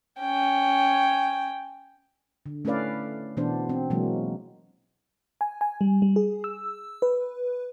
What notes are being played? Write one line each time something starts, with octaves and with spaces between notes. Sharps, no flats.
C#4 G5
D3
A3 C#4 E4 B4 D5 F5
B2 E3 B3 D4 C5
C4
B2 E3 F#3 G#3 A#3
G#5
G#5
G3
G3
G#4
E6
B4